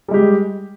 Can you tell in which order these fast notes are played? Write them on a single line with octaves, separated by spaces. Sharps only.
G3 G#3 G4